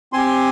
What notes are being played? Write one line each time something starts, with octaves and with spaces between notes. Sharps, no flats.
C4 G4 G#5 C6